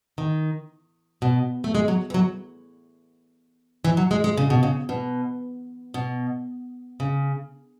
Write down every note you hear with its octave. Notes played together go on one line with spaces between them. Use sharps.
D#3
B2
A3
G#3
F#3
E3
F#3
E3
F#3
G#3
G#3
C#3
B2
C#3
B2
B2
C#3